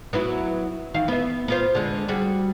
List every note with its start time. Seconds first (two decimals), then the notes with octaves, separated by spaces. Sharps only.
0.13 F#3 B3 E4
0.94 D#3 E3 F5
1.08 B3 E5
1.48 B3 F4 C5
1.75 D3 G#3
2.08 G3 F#4 G#4